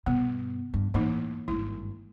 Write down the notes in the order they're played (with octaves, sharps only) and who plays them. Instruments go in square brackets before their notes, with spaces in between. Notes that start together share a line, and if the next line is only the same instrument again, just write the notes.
[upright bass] G2 B2 [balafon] B3
[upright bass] G2
[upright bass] A2 [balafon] E3 A#3 D#4
[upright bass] G#1 G2 [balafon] E4